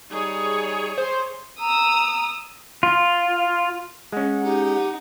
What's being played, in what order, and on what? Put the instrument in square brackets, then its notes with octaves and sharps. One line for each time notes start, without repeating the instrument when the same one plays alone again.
[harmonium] G3 D#4 [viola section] G#4 C#5
[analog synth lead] C5
[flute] A#5 [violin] D#6 E6
[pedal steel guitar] F4
[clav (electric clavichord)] G#3 C#4 [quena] F#5
[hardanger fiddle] D#4 [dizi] G4